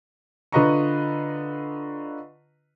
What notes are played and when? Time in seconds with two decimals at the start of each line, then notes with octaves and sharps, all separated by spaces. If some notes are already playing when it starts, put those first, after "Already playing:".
0.52 D3 F4 B4 D#5 A#5 C#6